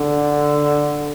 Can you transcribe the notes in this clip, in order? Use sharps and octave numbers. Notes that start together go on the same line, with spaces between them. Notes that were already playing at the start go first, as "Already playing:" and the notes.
Already playing: D3